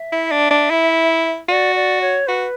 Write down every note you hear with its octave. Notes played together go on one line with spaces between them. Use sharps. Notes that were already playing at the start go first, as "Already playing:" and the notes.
Already playing: E5
E4
D4
D4
E4
F#4 D5
D5
C#5
F#4 B4